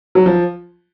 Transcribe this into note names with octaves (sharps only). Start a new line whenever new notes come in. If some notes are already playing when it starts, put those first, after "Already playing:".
F#3
F3